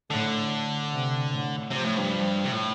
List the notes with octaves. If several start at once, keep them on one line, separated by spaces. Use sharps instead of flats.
A2 D3
C3
A2
C3 F3
A2
G2
F3
C3
A2